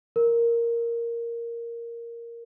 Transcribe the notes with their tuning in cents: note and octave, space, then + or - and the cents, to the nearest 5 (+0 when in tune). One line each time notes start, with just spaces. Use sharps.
A#4 +0